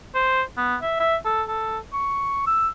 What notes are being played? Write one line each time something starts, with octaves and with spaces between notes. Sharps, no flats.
C5
B3
E5
E5
A4
A4
C#6
E6